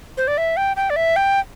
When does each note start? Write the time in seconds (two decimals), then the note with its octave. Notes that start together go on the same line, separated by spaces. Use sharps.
0.17 C5
0.28 D5
0.38 E5
0.57 G5
0.77 G5
0.90 D5
0.96 E5
1.16 G5